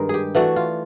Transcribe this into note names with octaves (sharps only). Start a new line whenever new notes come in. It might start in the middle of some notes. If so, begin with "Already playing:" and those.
Already playing: G2 D#3 G#3 A#4
G4 G#4
E3 A3 D4 F#4
F4